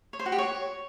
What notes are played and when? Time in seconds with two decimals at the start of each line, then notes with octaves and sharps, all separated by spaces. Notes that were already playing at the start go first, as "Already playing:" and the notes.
0.13 C#5
0.19 C5
0.26 F#4
0.32 G4
0.38 C#5